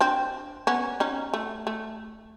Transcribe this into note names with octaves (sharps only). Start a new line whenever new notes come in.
C4 D4
B3 C#4
C#4 D#4
A3
A3